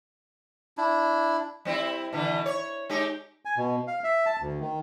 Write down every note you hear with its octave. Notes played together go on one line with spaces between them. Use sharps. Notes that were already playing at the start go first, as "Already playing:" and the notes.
D4 E4
G3 C4 E4
B2 D3 E3
C#5
G#3 D#4 G4
G#5
B2
F5
E5
A5
D2
D#3